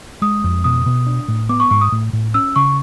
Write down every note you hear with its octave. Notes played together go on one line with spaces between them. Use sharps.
G#3 D#6
F2
B2 D#6
B2
D4
A2
B3 D6
C#6
G#2 C#6
D#6
A2
A2
C#4 E6
C#3 C#6